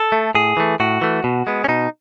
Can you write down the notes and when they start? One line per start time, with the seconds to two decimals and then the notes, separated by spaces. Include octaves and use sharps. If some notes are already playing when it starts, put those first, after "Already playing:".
Already playing: A4
0.12 A3
0.35 A2 G#4
0.57 E3 A3
0.80 A2 F#4
1.02 E3 A3
1.24 B2
1.47 G#3 B3
1.64 C#4
1.68 B2 D#4